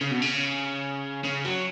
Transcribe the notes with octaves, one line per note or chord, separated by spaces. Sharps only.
C#3
B2
C#3
C#3
F#3